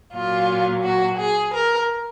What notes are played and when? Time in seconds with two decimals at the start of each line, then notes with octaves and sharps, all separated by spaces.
0.14 A#2 F#3 F4
0.84 F#4
1.19 G#4
1.53 A#4